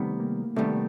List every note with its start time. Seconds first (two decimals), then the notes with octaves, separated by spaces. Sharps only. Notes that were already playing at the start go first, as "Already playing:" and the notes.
Already playing: C3 D#3 G3 A3 B3
0.20 A#3
0.56 C3 D#3 G3 A3 B3